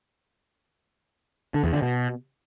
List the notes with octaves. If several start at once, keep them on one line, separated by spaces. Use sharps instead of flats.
D3
E2
D3
B2